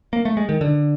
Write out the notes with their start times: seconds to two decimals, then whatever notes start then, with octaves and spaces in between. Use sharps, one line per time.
0.13 A#3
0.25 A3
0.37 G#3
0.49 D#3
0.61 D3